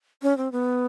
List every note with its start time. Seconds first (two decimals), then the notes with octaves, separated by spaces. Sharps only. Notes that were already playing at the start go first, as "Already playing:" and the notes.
0.22 C#4
0.38 C4
0.52 B3